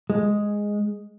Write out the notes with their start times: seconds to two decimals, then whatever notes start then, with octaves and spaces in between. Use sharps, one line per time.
0.10 G#3